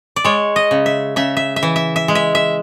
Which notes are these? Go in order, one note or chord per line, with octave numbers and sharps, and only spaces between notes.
D5
G#3 C#5
D#5
C#3
E5
C#3 E5
E5
E5
E3
E5
E5
G#3
E5
E5